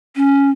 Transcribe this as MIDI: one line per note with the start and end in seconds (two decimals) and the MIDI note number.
0.16 0.50 61